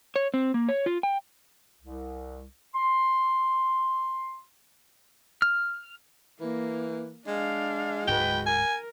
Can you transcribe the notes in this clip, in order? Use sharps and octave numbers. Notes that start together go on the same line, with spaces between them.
C#5
C4
A#3
C#5
F4
G5
C2
C6
F6
E3 A#3
G#3 D4 F5
D1 G#2 F#4 B4 G5
A#4 G#5